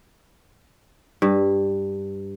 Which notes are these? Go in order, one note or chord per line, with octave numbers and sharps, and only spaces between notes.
G2